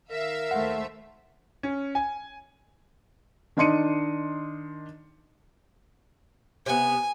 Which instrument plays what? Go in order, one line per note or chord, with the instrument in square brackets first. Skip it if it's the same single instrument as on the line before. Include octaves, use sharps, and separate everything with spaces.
[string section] D#3 E5 F5 [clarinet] A#4
[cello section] D#2 A3 C5 [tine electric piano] F#5
[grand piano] C#4
G#5
[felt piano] D#3 D4 D#5 C6 C#7 D#7
[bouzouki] C3 B3 [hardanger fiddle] G#5